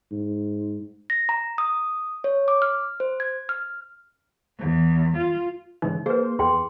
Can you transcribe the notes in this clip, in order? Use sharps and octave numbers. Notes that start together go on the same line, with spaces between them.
G#2
A#6
A#5
D#6
C#5
D6
F6
C5
G#6
F6
E2
F4
G#2 C#3 E3 D#4
A#3 G#4 B4 C5
E2 G#4 G5 C6